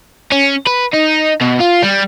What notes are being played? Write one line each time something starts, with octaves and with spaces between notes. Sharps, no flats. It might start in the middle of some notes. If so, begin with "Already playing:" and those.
C#4
B4
D#4
B2
F4
G3